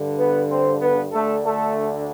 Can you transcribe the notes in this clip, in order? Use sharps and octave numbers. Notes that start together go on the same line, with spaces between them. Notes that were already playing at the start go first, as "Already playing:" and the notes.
Already playing: G2 D3
B3 B4
C4 C5
B3 B4
D2 D3 A3 A4
A3 A4